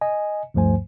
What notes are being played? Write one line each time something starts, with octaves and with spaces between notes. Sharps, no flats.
D#5 G#5
D2 G2 F3 A3 C5 G#5